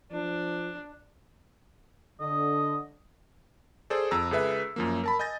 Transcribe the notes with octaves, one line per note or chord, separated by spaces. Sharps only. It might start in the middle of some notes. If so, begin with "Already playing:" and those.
F3 D4
D3 D#5
G#4 A4 C5 D5
F2 A#5 E6
C#2 G#4 A4 B4 E5
F#2 F3 A#3
A#4 A5 B5
D#5 G#5 G6 A6 A#6